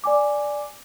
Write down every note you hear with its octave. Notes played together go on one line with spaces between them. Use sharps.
D5 G#5 D6